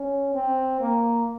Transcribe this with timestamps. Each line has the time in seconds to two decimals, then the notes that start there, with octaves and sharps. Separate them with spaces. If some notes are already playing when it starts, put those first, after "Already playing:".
Already playing: C#4
0.35 C4
0.81 A#3